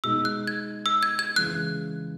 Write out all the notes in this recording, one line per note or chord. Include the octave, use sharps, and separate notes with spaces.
B2 G#3 D#4 E6
F#6
G#6
E6
G#6
G#6
C#3 E3 G#3 F#6